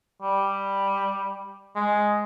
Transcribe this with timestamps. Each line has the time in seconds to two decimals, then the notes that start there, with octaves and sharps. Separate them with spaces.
0.22 G3
1.76 G#3